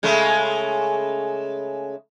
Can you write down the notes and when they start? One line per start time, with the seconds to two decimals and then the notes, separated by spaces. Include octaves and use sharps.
0.03 C#3 G#3 A3